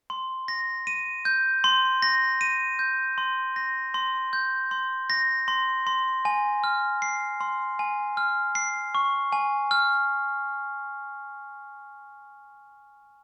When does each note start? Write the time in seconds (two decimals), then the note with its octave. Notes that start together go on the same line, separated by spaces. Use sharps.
0.10 C6
0.48 A#6
0.87 D#7
1.25 G6
1.64 C6
2.02 A#6
2.41 D#7
2.79 G6
3.18 C6
3.56 A#6
3.94 C6
4.33 G6
4.71 C6
5.10 A#6
5.48 C6
5.87 C6
6.25 G#5
6.64 F6
7.02 C7
7.40 C6
7.79 G#5
8.17 F6
8.55 C7
8.95 C#6
9.32 G#5
9.71 F6